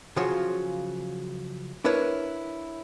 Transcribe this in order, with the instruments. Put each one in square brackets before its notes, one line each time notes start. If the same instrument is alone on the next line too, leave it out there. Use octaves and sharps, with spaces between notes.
[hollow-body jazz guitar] C#3 F3 F#3 F4 F#4 C#5
D4 E4 A#4 B4 C#5